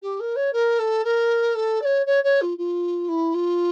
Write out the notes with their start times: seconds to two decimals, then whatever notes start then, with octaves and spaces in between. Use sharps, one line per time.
0.02 G4
0.20 A#4
0.36 C#5
0.53 A#4
0.79 A4
1.05 A#4
1.55 A4
1.82 D5
1.85 C#5
2.06 C#5
2.24 C#5
2.41 F4
2.58 F4
3.09 E4
3.34 F4